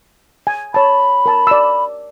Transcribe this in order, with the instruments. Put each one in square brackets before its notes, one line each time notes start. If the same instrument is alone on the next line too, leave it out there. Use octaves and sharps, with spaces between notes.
[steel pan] G#5
[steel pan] C#5 A5 [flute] B5
[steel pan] A#4 A5
D5 E6